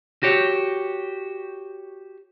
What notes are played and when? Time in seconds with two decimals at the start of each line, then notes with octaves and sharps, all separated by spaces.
0.23 F#4 G4 C#5